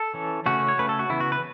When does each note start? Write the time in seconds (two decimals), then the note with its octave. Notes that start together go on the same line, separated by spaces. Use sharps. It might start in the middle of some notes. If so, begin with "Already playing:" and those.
Already playing: A4
0.14 E3 C#4
0.46 C#3 A3 C#4 F#4
0.68 C#5
0.78 C#3 A3 C#4 B4
0.89 A4
0.99 F#4
1.09 C#3 E3 B3 E4
1.20 F#4
1.32 B4